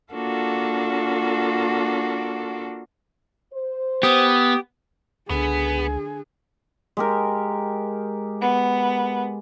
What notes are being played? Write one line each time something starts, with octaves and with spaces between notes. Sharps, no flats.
A#3 D4 F4 F#4 A4
C5
B3 G4 D#6
C#2 D3 B3 G#4
G#3 G4 A#4
B3